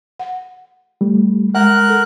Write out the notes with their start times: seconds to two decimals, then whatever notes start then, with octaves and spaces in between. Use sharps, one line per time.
0.19 F#5
1.01 G3 A3
1.55 G#3 A#4 E5 F#5 F#6
1.89 A4